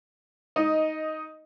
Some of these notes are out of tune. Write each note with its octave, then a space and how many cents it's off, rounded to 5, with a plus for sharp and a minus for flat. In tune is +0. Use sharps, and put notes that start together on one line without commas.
D#4 +10 D#5 +0